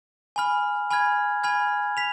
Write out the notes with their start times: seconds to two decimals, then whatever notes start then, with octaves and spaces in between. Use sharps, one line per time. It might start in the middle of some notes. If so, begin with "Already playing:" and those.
0.36 G#5 B5 F6
0.91 G#5 B5 F6 G#6
1.43 G#5 B5 F6 G#6
1.97 B6 F7